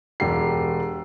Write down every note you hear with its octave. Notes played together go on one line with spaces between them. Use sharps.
E1 G4 C7